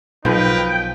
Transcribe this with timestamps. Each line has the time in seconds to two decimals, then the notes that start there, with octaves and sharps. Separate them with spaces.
0.25 B1 F3 D#4 A#4 B4 G5